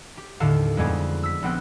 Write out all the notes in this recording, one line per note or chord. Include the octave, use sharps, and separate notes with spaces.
G4
D#2 A2 D3 A4 F5
F2 G3 G#3 B3 G#4 D5
E6 B6
A#1 B3 C4 G5 F#6